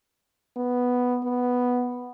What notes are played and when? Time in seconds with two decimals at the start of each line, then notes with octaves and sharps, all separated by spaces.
0.56 B3
1.24 B3